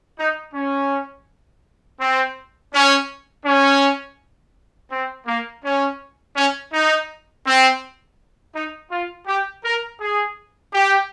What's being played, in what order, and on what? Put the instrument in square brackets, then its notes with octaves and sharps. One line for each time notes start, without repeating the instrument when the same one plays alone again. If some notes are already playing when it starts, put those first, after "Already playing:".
[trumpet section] D#4
C#4
C4
C#4
C#4
C4
A#3
C#4
C#4
D#4
C4
D#4
F4
G4
A#4
G#4
G4